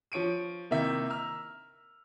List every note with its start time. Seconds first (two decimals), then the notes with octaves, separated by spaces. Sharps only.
0.12 F3 C#5 D7 D#7
0.71 C3 D#3 A#3 E4 E5
1.09 A#5 E6 F6